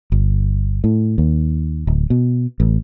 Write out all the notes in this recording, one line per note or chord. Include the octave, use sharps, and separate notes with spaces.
G1
A2
D#2
D1
B2
A1